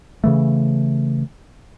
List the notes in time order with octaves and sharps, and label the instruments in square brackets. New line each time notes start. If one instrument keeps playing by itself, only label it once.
[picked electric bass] C#3 E3 A3